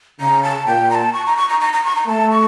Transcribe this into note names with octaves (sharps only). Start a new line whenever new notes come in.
C#3 A#5
A5
A#2 G5
A#5
A5
C#6
A#5
C#6
A#5
A#5
A#5
C#6
A#5
A3 A5
C#6